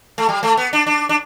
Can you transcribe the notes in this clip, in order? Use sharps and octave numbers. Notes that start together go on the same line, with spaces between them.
A3
G3
A3
B3
D4
D4
D4